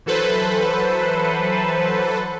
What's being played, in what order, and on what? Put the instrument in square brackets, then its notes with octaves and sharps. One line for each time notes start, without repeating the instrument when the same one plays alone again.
[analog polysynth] E3 F#3 A4 B4 C5